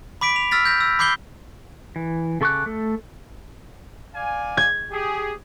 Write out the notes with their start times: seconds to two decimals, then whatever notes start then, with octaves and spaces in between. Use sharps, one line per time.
0.21 B5 D6 B6 D7
0.36 F7
0.51 E6 F6 A6 B6
0.65 G6 A#6
0.81 E6
0.99 B5 D6 G6 C7 G7
1.96 E3
2.41 C#3 A4 C#6 D6 F#6
2.66 A3 A4
4.15 D5 F5 G#5
4.57 G#6
4.92 G4 G#4